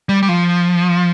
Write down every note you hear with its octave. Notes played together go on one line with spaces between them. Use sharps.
G3
G3
F3